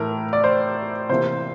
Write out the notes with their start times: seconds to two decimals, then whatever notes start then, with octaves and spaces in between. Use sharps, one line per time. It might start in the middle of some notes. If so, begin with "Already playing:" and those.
Already playing: A2 E3 A3 A#4
0.33 D5
0.44 C5
1.09 C3 E3 A#3 C5